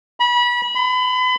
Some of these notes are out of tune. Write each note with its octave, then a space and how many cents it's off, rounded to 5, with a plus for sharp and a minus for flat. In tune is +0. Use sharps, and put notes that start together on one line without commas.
B5 -30
B5 +35